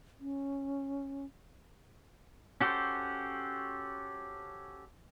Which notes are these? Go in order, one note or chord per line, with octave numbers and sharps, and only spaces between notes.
C#4
C#4 F#4 G4 A4 C5